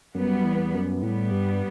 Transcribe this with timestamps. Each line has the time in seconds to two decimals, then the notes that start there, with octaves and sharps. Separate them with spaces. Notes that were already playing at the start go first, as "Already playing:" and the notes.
0.15 F#2 G3 B3
0.44 E2
0.74 F#2
1.02 A2 G3 B3
1.31 G2